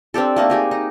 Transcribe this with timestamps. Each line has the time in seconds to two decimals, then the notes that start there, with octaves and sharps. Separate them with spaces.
0.14 C4 D4 G4 A4
0.36 A3 A#3 D#4
0.50 D#4 G4 G#4
0.71 D#4